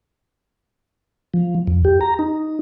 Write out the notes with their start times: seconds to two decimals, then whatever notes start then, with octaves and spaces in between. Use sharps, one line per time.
1.34 F3
1.67 F2
1.85 G4
2.01 A#5
2.19 D#4